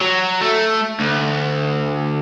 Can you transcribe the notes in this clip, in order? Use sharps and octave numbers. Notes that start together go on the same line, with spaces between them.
F#3
A3
D2